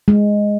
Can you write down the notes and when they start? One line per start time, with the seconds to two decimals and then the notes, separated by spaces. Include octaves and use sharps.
0.08 G#3